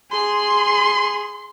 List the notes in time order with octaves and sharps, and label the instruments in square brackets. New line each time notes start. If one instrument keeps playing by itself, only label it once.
[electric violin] G#4 [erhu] C6